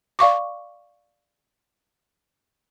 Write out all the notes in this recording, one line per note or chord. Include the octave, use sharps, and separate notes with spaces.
D5 F5 C#6 D6